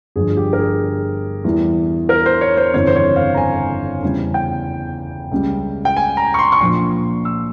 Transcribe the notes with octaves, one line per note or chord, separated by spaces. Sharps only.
G1 G2 F3 G#4
G4
A#4
G#4
E2 E3 G3
A#4
C5
C#5
C5
G1 F2 C#3 E3 C#5
C5
C#5
F5
A#5
G#5
E2 C#3 G3 G#5
G5
C#2 C#3 G3
G5
G#5
A#5
C#6
C6
C#6
A#1 A#2 F3 C6
E6